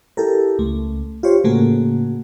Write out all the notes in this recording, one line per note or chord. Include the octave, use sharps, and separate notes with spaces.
E4 G4 A4 A#4
C#2 A3
F4 G4 C5 C#5
A2 C#3 A3 A#3 F#4 G#4